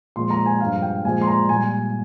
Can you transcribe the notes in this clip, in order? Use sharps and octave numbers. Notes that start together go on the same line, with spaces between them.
A#2 F3 G#3 C6
A#5
G#5
G2 F3 G#3 F5
G5
A#2 F3 G#3 G#5
C6
A#5
A#2 G3 G#5